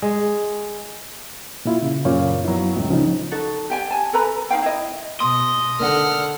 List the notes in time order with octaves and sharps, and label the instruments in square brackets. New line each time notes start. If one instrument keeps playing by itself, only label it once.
[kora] G#3
[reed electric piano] A#2 E4 F4
C#3
[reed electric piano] F#2 C#5 F5 [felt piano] A#2 C#3
[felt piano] F#3 B3 E4
[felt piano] C#2 [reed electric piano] A2
[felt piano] C#3 [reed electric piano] F3 C#4 D#4
[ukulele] D#4 F#4 A4
G4 G5 G#5
G#5 A5
A4 B4 A#5 B5
D#4 F4 F5 G5
E4 D#5
[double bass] B2 [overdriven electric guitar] D#5 [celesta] C6
[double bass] D3 [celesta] A#4 [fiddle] F#5 F6